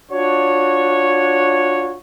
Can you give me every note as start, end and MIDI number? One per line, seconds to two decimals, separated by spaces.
0.12 1.96 62
0.12 1.96 65
0.12 1.96 66
0.12 1.96 73